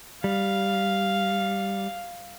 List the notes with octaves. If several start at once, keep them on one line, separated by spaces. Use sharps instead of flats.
G3 F5